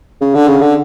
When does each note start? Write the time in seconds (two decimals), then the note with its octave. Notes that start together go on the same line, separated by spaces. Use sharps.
0.21 C#3
0.35 D3
0.48 C#3
0.61 D3